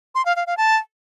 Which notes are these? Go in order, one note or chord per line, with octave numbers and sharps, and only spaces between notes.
C6
F5
F5
F5
A5